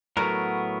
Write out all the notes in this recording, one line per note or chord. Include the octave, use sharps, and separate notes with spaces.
A2 F#3 B3 A#4